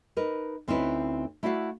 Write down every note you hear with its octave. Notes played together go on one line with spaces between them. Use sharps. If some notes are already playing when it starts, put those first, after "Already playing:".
D#4 A#4 B4
D2 C4 C#4 D#4 E4 B4
A3 E4 F#4 D5 F5 F#5